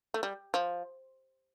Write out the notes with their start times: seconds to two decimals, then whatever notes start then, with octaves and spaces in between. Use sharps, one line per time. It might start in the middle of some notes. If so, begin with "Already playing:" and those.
0.14 A3
0.23 G3
0.54 F3